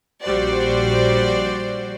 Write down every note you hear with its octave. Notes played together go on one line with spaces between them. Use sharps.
A#1 G3 F#4 C5 D5